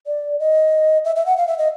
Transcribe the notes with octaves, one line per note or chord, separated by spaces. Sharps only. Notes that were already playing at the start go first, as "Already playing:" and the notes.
D5
D#5
E5
E5
F#5
F5
E5
D#5